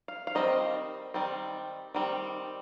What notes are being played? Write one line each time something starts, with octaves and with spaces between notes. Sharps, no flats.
F5
F5
D#3 G3 C4 D#5
D#3 G3 C4
D#3 G3 C4